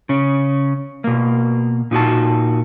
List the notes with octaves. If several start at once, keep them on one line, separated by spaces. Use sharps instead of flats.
C#3 C#4
B2 A#3
A#2 D#4 F#4 A5